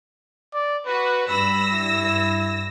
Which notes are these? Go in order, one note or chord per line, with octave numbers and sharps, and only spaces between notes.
D5
F#4 B4
G2 B5 E6 A#6
E4